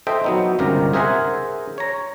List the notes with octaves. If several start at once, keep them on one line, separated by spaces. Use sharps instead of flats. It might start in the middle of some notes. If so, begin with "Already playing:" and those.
A4 C5 D#5 E5 G5
F#3 B3 D#4
G1 C#2 C3 D#3 G4 A#4
G#4 A#4 C5 E5 F#5 G#5
C#5 A#5